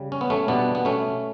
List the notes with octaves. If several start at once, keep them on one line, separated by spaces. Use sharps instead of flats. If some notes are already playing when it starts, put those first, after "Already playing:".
Already playing: C#3 G3
C#4
B3
A3 C#4
B2 G3 B3 D4
B3
A3 C#4